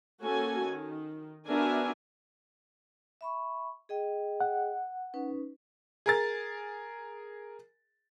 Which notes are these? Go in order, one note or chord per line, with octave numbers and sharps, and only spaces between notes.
A#3 C#4 F#4 A4 G#5
D#3
B3 D4 F#4 A#4 E5 G#5
E5 B5 C#6
G#4 D#5 G5
F#5
C#4 D#4 B4
G#4 A#4 A6